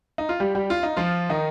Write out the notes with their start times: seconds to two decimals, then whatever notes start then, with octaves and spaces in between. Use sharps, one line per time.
0.18 D#4
0.29 F4
0.40 G3 G4
0.55 G3 G4
0.70 F4
0.83 D#4
0.97 F3 F4
1.29 D#3 D#4